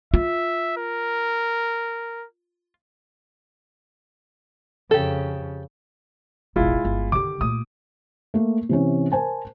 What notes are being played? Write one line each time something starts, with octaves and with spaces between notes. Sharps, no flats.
F4 E5
A#4
F2 C#3 G4 A4
E1 A1 G#3 E4 F4
G1
D3 D#3 G4 D6
A#2 A3 D#6
A3 A#3
C3 E3 C#4
A#4 C5 G#5 A5